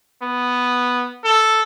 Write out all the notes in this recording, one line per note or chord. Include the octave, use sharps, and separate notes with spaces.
B3
A4